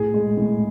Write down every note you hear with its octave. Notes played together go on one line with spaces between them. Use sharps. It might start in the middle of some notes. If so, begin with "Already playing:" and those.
Already playing: A2 G#4
G#3
A2